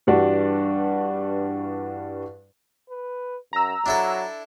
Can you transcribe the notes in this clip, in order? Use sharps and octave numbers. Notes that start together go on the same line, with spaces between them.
G2 E3 G3 D4 F#4
B4
F#2 A#5 E6
F#3 D4 E4 A4